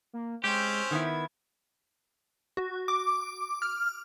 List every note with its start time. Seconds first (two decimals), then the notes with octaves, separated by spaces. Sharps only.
0.13 A#3
0.44 G#3 C4 C#4 G4 C5
0.91 D#3 B3 E4 G#6
2.57 F#4
2.88 D6
3.62 F6